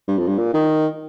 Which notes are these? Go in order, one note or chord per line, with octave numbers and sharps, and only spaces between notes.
G2
F2
G2
A#2
D#3